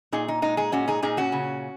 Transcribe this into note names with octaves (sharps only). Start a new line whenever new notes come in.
A#2 D#4 G#4
D#4
G#3 D#4
D#4 G#4
A#2 C#4 F#4
D#4 G#4
A#2 D#4 G#4
C#4 F#4
C#3